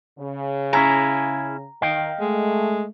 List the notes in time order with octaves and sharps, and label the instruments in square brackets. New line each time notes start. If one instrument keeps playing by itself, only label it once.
[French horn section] C#3
[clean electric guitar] C#4 E4 G#4 [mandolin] A#5
[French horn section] D#3 [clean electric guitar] D#5 F5 G5
[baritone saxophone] G#3 [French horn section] A3